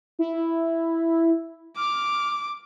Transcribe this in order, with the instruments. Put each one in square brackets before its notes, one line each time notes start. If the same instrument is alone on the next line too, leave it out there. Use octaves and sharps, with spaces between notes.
[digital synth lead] E4
[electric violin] D6 [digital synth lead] F6